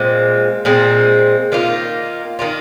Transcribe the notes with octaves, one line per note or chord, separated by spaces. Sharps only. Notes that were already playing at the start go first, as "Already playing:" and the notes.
Already playing: A#2 G#3 C4
A#2 G#3 C4
D#3 A#3 F4
D#3 A#3 F4